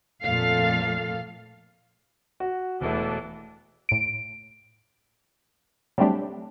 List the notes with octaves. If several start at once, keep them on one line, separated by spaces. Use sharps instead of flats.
F2 A#2 A3 A4 F5
F#4
E1 B2 E3 A3 D4
A2 D7
F#3 G3 A3 C4 D4 G4